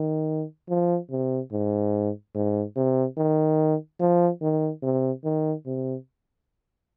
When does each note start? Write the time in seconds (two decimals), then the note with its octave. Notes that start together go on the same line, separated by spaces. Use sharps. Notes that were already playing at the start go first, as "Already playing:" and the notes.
Already playing: D#3
0.69 F3
1.11 C3
1.52 G#2
2.35 G#2
2.76 C3
3.17 D#3
4.00 F3
4.42 D#3
4.83 C3
5.24 D#3
5.66 C3